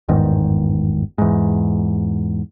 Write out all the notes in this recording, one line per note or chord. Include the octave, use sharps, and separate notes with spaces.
G1 E2 G#2 D#3
E2 G#2